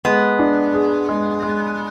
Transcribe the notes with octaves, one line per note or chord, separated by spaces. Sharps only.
G#3 B3
D4
G#4
G#3
G#3